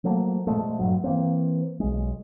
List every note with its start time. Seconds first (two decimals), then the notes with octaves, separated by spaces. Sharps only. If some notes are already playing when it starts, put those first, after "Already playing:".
0.04 F3 F#3 A3 A#3
0.47 A#2 F3 G#3 A3
0.79 G2 F#3
1.04 E3 A#3 C4
1.80 B1 G#3